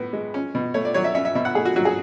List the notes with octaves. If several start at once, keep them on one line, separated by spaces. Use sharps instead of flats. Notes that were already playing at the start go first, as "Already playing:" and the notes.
Already playing: A2 B3
G#3
C#4
B2
A3 C#5
D5
F#3 C#5
E5
C#4 E5
E5
B2 E5
F#5
A3 G#4
F#4
F#3 F#4
G#4